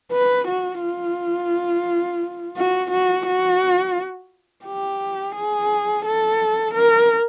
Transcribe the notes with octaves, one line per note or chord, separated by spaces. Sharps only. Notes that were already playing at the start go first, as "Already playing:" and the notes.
B4
F#4
F4
F#4
F#4
F#4
G4
G#4
A4
A#4